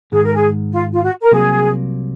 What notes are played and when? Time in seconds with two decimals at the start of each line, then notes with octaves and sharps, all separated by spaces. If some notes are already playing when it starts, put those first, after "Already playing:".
0.12 G#2 D#3 G#3 G#4
0.23 A#4
0.35 G#4
0.72 F4
0.93 F4
1.02 F#4
1.20 A#4
1.31 C2 C3 F#3 A#3 G#4